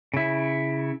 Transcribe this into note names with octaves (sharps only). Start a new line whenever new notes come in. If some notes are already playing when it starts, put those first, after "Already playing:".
C#3 E4